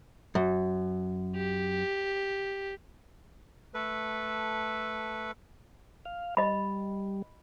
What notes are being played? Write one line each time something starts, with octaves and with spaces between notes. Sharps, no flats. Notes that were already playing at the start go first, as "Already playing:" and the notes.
F#2
G4
A3 A4 B4
F5
G3 D#5 B5